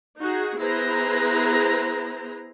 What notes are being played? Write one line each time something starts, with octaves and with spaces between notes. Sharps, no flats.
D#4 F#4 G#4
B3 E4 G#4 B4 C5 A#5